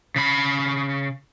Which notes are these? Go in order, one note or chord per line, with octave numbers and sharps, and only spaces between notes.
C#3 B5